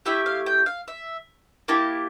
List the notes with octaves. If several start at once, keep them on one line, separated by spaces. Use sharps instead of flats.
A3 E4 G4 E5
F5
G5
F5
E5
A#3 E4 G4 A5